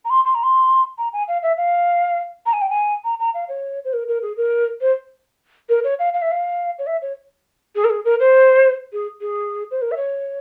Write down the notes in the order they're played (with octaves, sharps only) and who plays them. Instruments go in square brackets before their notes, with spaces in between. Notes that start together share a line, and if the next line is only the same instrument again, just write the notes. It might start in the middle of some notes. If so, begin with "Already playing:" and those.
[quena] A#5
C6
C6
A#5
C6
A#5
G#5
F5
E5
F5
A#5
G#5
G5
G#5
A#5
A#5
F5
C#5
C5
A#4
A#4
G#4
A#4
C5
A#4
C#5
F5
F5
E5
F5
C#5
E5
C#5
G#4
A#4
G#4
A#4
C5
G#4
G#4
C5
A#4
E5
C#5